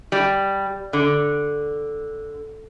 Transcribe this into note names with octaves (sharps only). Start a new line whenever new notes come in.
G3
D3